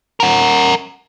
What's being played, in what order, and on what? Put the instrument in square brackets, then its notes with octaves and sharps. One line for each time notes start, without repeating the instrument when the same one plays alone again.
[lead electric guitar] A#4 F#5